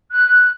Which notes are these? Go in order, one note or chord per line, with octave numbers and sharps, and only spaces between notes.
F#6